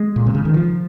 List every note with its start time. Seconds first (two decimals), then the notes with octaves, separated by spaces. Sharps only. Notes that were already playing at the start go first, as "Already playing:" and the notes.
Already playing: G#3
0.16 A#2
0.26 C3
0.35 C#3
0.45 D#3
0.54 F3